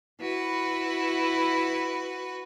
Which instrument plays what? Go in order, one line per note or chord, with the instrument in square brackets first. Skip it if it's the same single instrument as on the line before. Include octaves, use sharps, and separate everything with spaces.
[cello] E4 [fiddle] F#4 B4